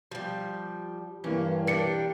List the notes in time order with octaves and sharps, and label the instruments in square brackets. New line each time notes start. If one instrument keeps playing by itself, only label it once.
[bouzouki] F3 G3
[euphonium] G2 [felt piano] E3 A#3 [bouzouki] C#4
[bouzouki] D4 G4 [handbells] A#4 C#7